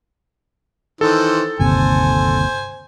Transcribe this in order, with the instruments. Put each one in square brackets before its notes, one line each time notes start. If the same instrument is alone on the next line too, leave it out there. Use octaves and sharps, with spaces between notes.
[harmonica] D#3 E3 C5 [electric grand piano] A4
[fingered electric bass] G1 D#2 C3 [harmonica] C5 G#5